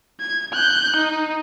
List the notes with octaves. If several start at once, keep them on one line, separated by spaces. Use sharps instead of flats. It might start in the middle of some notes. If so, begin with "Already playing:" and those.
G#6
F#6 G6
D#4